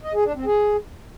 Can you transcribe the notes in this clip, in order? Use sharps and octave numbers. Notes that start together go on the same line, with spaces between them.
D#5
G#4
D4
C4
G#4